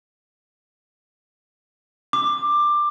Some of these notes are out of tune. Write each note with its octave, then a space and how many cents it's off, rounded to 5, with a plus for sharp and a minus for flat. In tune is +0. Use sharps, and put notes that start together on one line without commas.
D6 +15